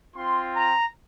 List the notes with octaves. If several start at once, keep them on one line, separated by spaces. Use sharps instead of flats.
C4 F4 C6
A#5